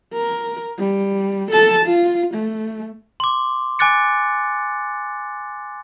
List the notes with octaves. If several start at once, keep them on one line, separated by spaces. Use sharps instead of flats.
A#4
G3
A4 A5
F4
A3
C6 D6
G#5 D6 F#6 A6 C#7